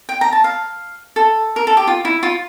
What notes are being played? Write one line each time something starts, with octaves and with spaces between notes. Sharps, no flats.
G5
A#5
A5
F5
A4
A#4
A4
G4
F4
E4
F4